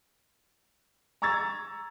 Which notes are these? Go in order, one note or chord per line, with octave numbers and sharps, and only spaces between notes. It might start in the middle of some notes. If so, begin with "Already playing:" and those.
A#5 C#6 E6 G#6 A6